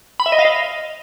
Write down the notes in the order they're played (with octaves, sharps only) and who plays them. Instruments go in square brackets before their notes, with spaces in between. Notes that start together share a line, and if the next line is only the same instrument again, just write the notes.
[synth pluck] B5
E5
D#5
F5
D#5